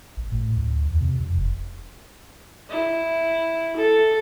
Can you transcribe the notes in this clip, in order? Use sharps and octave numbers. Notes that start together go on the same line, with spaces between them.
A1
A2
D2
E2
C3
F2
F1
E4
A4